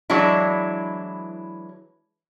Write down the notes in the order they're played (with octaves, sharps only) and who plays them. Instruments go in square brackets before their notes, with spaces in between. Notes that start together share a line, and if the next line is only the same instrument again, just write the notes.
[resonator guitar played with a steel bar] E3 F#3 G#3 D4 E4